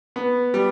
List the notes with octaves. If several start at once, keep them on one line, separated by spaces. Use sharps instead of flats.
B3
G3